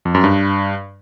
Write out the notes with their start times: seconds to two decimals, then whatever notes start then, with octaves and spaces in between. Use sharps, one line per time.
0.05 F2
0.15 F#2
0.24 G2